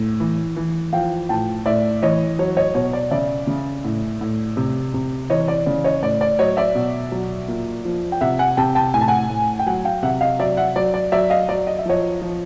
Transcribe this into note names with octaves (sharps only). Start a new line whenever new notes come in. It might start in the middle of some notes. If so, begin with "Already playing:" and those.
Already playing: A2
E3
E3
F3 F5 G5
A2 G5 A5
A2 D5 E5
E3 C#5 D#5
F#3 C#5
C#5 D#5
B2 C#5
D5
C#3 D5 E5
C#3
A2
A2
C3
C3
E3 C#5 D#5
D5
C#3 D5
C#5 D#5
A2 D5
D5
F#3 C#5 D#5
D5 E5
B2
F#3
A#2
F3
G5
C3 E5 F#5
F#5 G#5
C3 G5 A5
G5 A5
A2 G#5
A5
F#5 G#5
A2
G5
F#3 F#5 G#5
F5 G5
C3 E5 F#5
D#5 F5
F#3 D5 E5
E5 F#5
F#3 D5
D5
F#3 D5 E5
D#5 F5
F#3 D5
D#5
E5
F3 C#5 D#5
F3